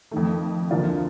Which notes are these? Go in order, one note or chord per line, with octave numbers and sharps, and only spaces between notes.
F2 D#3 A3
D2 D3 F3 A#3 F4